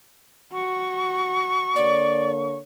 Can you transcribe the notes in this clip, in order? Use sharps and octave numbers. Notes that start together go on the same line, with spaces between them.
F#4 C#6
D3 A#3 C#5 D5